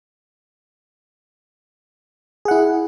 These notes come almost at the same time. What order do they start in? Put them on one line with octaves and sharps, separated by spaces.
G#4 F#5 E4